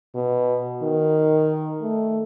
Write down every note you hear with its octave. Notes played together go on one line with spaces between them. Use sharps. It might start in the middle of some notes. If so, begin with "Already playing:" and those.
B2
D#3
A3